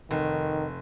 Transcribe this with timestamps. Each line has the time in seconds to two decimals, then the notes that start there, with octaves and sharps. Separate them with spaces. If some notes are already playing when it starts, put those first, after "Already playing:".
0.11 F1 D#3